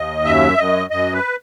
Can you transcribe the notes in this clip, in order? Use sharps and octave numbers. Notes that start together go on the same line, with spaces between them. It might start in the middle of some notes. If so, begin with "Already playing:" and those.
Already playing: D#2 D#5
F#2 E5
F#2 D#5
F#2 D#5
B4